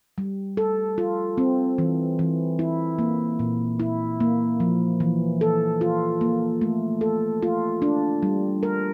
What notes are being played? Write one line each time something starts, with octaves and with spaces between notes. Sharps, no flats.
G3
A4
F4
C4
E3
E3
E4
A#3
A#2
E4
A#3
F3
E3
A4
F4
A#3
A3
A4
F4
D4
G3
A#4